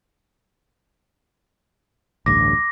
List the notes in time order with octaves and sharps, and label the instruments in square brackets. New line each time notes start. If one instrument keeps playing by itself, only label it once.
[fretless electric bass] A1 D2 G2 [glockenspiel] D6 A#6